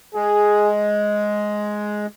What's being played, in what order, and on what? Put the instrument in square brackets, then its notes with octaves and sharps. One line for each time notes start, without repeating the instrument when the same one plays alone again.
[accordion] G#3 [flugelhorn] G#4